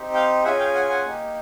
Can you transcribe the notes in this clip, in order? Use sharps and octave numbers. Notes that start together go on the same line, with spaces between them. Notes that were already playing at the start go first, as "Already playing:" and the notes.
Already playing: C4 D#4 G4
F5 G5
C#4 F4 G#4 E5 F#5
F5 G5
F#5 G#5
F#5 G#5
A#3 D#4 G4